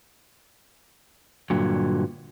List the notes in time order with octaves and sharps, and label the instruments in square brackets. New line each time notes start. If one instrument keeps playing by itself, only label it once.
[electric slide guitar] G2 A#2 D3 F#3